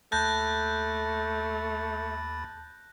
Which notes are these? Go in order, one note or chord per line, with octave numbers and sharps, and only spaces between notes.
D#2 A3 A5 B5 F#6 G6 A6 A#6